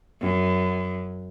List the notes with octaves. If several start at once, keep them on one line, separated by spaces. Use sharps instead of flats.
F#2